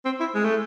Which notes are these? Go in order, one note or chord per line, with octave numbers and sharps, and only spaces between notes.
C4
E4
G#3
A3